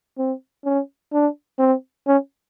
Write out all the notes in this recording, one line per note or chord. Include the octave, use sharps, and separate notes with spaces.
C4
C#4
D4
C4
C#4